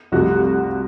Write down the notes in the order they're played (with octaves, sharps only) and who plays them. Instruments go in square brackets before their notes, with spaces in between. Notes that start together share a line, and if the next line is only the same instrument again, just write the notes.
[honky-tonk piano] C2 C3 F3 A3 F#4